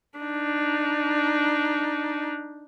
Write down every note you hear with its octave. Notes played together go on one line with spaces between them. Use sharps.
D4 D#4